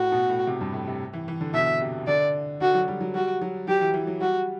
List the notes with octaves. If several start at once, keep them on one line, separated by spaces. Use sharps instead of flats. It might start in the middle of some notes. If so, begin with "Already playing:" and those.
Already playing: A2 F#4
B2
A2
C3
G2
A2
C3
E3
E3
D3
B2 E5
C3
D3 D5
D3 F#4
F#3
G3
F#3
G3 F#4
F#3
F#3 G4
E3
E3
F#3
G3 F#4